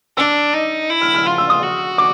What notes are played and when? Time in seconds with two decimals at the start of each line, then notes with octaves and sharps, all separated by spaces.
0.17 D4 E6
0.54 D#4
0.90 E4
1.01 F6
1.15 F6
1.26 F4 F6
1.38 E6
1.50 D#6
1.63 F#4
1.98 D6